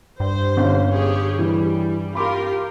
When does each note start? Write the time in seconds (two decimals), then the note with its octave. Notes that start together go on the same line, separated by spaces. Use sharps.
0.20 G2 C5
0.57 G1 C#4
0.90 G4 G#4 C#5
1.39 E3 G3
2.15 F4 G4 A#4 B5 C6 D6